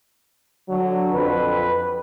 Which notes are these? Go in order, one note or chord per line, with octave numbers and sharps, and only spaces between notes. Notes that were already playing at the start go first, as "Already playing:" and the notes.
D3 F#3
F2 B4